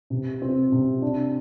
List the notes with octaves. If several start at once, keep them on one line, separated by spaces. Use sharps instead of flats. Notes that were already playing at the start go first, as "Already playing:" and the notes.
C3
C4
C3
D4